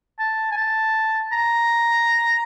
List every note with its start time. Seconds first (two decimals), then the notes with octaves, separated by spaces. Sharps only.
0.19 A5
0.51 G#5
0.57 A5
1.32 A#5